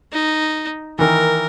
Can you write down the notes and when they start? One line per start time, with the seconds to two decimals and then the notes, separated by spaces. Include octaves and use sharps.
0.13 D#4
0.99 D#3 E3 A#4